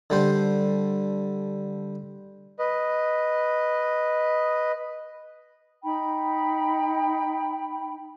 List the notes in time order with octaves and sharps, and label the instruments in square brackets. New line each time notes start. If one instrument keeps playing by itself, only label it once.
[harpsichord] D3 G3 C5
[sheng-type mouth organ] B4 D#5
[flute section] D#4 G5 B5